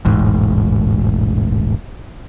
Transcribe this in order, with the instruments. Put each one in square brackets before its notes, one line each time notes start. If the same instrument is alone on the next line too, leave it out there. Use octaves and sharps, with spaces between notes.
[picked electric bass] E1 A1 G#2